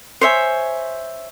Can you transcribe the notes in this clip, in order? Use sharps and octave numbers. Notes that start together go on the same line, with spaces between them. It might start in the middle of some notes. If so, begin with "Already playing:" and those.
C5 C#5 E5 G#5